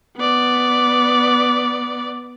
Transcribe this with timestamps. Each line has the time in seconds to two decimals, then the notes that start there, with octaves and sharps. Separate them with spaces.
0.16 B3 D5